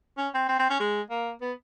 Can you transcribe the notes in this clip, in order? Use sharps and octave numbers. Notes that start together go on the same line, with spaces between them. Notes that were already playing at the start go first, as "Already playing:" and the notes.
C#4
C4
C4
C4
C#4
G#3
A#3
B3